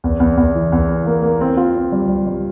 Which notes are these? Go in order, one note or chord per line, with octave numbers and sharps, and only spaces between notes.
E2
E2
E2
E3
E2
E3
A#3
A#3
C4
F4
C4
G3
G3
G3